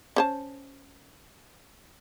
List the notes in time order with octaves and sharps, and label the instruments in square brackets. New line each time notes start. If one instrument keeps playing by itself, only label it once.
[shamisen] C#4 C5 A5